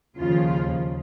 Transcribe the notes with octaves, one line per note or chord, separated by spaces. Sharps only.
D#2 C#3 F3 F4